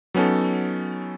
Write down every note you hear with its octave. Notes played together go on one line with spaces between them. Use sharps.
F#3 B3 C#4 D#4 A4